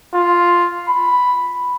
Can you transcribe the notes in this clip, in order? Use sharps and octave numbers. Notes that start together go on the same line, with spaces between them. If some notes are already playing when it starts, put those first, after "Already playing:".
F4
B5